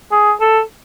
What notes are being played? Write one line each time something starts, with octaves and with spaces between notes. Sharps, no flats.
G#4
A4